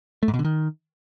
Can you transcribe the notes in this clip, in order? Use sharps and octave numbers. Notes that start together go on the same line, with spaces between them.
A3
G#2
B2
D3
D#3